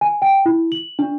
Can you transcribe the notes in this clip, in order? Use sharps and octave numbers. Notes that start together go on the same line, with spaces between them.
G#5
G5
E4
F#7
D4